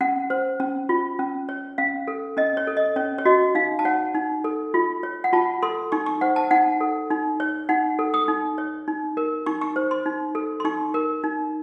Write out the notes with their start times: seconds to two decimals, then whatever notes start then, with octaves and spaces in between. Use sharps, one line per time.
0.01 C#4 F#5
0.30 C5
0.60 C#4
0.89 F4
1.19 C#4
1.49 C#5
1.78 C#4 F5
2.08 A4
2.37 C#4 D#5
2.57 C#5
2.67 A4
2.77 D#5
2.96 C#4 C#5
3.18 C#5
3.25 F#4 D#5
3.55 D#4 F5
3.79 A5
3.85 C#5 F#5
4.15 D#4
4.44 A4
4.74 F4
5.03 C#5
5.24 F#5
5.33 F4 A5
5.63 A4 C6
5.92 D#4 C#6
6.06 C#6
6.21 C5 F#5
6.36 A5
6.51 D#4 F#5
6.81 A4
7.11 D#4
7.40 C#5
7.69 D#4 F#5
7.99 A4
8.14 D#6
8.28 D#4
8.58 C#5
8.88 D#4
9.17 A#4
9.46 D#4 C#6
9.61 C#6
9.76 C5
9.91 C6
10.06 D#4
10.35 A4
10.60 C6
10.65 D#4 C#6
10.94 A#4
11.24 D#4